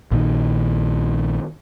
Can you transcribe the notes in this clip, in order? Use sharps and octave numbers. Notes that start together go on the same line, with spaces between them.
A#1 A#2 D#3